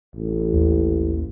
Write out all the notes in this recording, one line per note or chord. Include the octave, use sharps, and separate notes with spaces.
A1
D#2